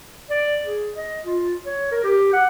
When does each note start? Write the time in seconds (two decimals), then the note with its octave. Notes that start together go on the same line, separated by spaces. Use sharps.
0.30 D5
0.65 G#4
0.95 D#5
1.24 F4
1.66 C#5
1.91 A#4
2.04 G4
2.33 F#5